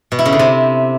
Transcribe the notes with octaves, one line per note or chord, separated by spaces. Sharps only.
B2
E4
C#3
D3
C3